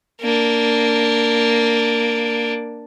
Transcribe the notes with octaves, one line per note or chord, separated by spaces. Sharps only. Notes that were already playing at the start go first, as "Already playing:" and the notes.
A#3 D4